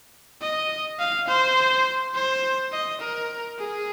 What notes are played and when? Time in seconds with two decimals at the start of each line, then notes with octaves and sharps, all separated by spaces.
0.41 D#5
0.99 F5
1.28 C5
2.14 C5
2.72 D#5
3.01 A#4
3.59 G#4